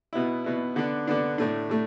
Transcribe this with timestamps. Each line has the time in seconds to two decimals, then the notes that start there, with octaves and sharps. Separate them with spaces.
0.13 B2 B3 E4
0.44 B2 B3 E4
0.76 D3 B3 D4
1.07 D3 B3 D4
1.38 A2 A3 D4
1.69 A2 A3